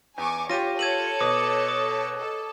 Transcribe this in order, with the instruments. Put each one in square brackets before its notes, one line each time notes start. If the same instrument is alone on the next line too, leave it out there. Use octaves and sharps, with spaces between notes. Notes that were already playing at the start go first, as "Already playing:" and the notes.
[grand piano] E2 [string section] G#5 C#6 D6
[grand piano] F4 G4 [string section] C#5 [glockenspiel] A#6 D#7
[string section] A4 C#5 C#7 [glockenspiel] G#6 D#7 F#7
[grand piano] B2 [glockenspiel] D6 D#6
[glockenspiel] D#6
[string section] A4